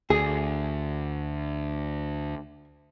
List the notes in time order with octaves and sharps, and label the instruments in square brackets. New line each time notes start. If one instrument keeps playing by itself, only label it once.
[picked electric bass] D2 [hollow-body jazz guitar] G#4